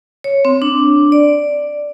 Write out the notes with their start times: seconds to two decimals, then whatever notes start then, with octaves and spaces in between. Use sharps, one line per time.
0.24 C#5
0.45 C4
0.62 D4
1.12 D5